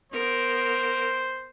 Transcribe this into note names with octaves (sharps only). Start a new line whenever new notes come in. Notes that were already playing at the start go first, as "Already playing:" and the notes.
B3 A#4 C5